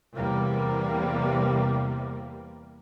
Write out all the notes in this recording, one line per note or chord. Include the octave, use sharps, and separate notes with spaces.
E2 C3 G3 A#3